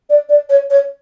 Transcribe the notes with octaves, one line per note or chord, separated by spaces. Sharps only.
D5
D5
C#5
C#5